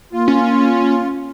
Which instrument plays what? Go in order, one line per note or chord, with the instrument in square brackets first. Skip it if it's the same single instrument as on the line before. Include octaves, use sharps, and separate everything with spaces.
[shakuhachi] A#3 [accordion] F4
[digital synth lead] C#4